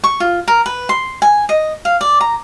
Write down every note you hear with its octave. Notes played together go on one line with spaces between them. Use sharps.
C#6
F4
A#4
B4
C6
G#5
D#5
F5
D5
A#5